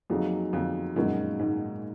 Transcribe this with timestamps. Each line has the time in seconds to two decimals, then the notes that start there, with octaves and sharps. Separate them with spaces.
0.10 F2 F#3 A#3 D#4 G#4
0.53 F2
0.96 F#2 A#2 G#3 D#4 F#4 A#4
1.39 G#2